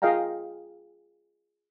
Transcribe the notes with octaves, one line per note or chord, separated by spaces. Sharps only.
F4 G#4 D#5 F5 G5 A#5